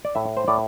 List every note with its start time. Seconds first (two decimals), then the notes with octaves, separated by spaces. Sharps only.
0.05 D5
0.15 A2 E5
0.37 C5
0.48 A2 D5